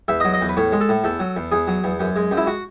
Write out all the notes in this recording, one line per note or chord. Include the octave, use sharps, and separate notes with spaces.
E2 E5
D#5
F#3
D#5
E2
B4
A2 C#5
G#3
A4
A2
E2 A4
F#3
E2
E2 G#4
F#3
E2
F#2
G#3
F#2
E4
F#4